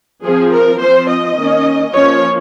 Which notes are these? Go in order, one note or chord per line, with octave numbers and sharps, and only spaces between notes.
F3 C4 G#4
A#4
F3 C4 C5
D#5
D#3 A#3 C#4
F3 A#3 C#4 C#5